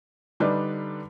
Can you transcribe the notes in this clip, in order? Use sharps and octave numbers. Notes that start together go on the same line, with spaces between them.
D3 G3 D4 D#4 B4